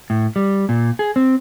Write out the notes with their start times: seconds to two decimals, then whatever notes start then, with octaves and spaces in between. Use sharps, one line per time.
0.10 A2
0.36 G3
0.69 A#2
0.99 G#4
1.16 C4